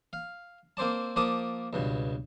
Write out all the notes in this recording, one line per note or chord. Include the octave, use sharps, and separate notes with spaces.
F5
A#3 C4 C5 D5 A5
F3 A#3 D5 A5 D6 D#6
C#2 G2 B2